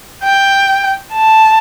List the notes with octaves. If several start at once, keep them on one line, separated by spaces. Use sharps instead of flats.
G5
A5